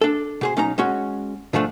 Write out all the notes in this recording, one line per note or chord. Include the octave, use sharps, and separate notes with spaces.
D4 A4
B2 G#4 C5
B1 C#4 D#4 A#5
G#3 C#4 F#4
G#2 D3 F3 A3 D4